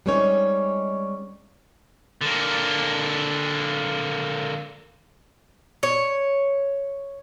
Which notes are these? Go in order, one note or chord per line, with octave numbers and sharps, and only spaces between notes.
G3 G#3 C4 C#4 D#4 C#5
D3 A#3
C#5